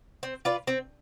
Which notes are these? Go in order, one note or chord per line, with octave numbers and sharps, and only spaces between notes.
C4
F4 B4 D5
C4